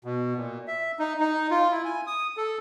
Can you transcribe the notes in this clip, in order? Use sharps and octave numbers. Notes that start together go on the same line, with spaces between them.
B2
A#2
E5
D#4
D#4
F4
E4
G#5
D#6
A4